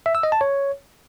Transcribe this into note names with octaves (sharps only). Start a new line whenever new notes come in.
E5
E6
D#5
A5
C#5